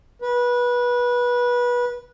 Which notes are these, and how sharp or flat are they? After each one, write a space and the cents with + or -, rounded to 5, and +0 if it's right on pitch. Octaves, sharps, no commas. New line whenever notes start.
B4 -20